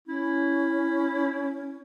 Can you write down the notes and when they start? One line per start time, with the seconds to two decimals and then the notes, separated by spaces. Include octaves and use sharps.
0.08 C#4 E4